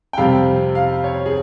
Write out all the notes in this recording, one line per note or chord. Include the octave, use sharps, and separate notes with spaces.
G5
F2 C3 G3 F5
F5
C#5
G#4